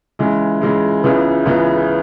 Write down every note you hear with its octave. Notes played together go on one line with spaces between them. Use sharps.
C#3 E3 G#3
C#3 E3 G#3
C#2 C#3 E3 B3
C#2 C#3 E3 B3